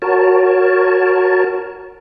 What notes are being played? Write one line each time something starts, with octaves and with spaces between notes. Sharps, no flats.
F#4 A#4 C#5 A5